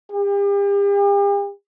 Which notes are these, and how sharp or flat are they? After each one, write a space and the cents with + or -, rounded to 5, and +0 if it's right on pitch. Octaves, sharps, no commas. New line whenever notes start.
G4 +40